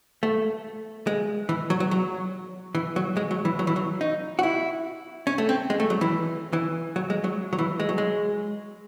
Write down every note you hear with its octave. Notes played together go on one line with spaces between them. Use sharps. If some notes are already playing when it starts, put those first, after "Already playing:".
A3
G#3
E3
F#3
F#3
F#3
E3
F#3
G#3
F#3
E3
F#3
E3
F#3
D#4
F#4
E4
C#4
A3
C4
G#3
A3
F#3
E3
E3
F#3
G#3
F#3
F#3
E3
G#3
F#3
G#3